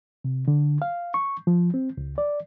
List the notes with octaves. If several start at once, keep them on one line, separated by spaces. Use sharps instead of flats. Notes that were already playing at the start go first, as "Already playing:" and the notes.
C3
D3
F5
C#6
F3
C4
C#2
D5